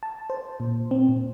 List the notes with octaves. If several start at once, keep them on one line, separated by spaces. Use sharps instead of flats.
A5
C5
A#2
C4
A#2